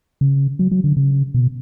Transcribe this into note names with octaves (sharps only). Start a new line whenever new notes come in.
C#3
F#3
F#3
D3
C#3
B2